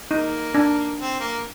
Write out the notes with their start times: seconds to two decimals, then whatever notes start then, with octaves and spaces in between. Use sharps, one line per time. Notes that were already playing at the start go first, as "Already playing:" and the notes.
0.11 A#3 D#4
0.54 D4
0.99 C4
1.20 A#3